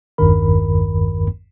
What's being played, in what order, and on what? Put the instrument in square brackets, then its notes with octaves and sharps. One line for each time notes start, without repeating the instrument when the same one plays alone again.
[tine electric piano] G#1 E2 G2 D#3 A#4 B5